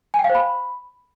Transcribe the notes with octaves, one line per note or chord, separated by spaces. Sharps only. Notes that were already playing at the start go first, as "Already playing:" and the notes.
G#5
G5
F5
C5
B5